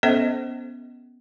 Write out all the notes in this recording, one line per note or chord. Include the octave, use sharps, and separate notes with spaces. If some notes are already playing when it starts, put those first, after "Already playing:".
B3 C#4 A4 C5 D#5 E5